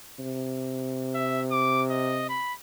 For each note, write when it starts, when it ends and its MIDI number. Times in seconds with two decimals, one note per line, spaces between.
0.19 2.41 48
1.15 1.42 76
1.52 1.82 86
1.90 2.27 75
2.29 2.54 83